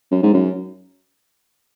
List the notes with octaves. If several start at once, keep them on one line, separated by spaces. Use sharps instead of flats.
F#2
G#2
F#2